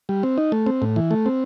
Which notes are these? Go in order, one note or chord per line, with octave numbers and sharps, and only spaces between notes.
G3
C4
D#4
A3
C4
A2
E3
A3
C4